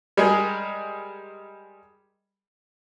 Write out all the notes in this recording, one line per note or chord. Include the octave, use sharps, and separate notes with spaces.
G3 G#3 G#4 A#4